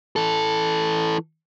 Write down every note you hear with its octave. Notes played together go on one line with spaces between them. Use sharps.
E3 A4